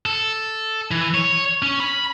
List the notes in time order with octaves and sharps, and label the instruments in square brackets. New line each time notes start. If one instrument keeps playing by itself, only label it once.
[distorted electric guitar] A4
E3
C#5
C#4
B5